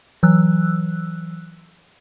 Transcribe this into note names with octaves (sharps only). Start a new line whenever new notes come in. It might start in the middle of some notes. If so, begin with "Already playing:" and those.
E3 F#3 E6 F#6